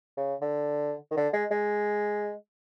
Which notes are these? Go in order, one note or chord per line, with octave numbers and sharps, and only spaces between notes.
C#3
D3
D#3
D3
G#3
G#3